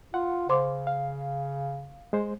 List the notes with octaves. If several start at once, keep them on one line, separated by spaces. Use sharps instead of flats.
F4 F#5
C#3 C5 C6 D6
F5
G#3 C5